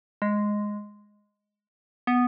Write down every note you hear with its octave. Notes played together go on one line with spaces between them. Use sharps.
G#3
B3